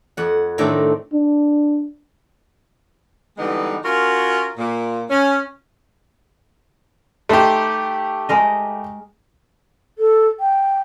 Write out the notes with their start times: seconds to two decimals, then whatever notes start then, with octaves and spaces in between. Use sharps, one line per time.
0.17 F2 F#5
0.58 A2 D#3 A3 C4 D4
1.13 D4
3.37 D3 E3 G3 G#3 B3 D#4
3.84 C#4 F4 F#4 A#4
4.57 A#2
5.10 C#4
7.29 A3 D#4 G4 C5
8.29 G#3 A#4 D#5
9.98 A4
10.40 G5